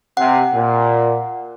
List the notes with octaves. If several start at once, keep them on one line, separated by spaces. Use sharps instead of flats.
C3 F#5
A#2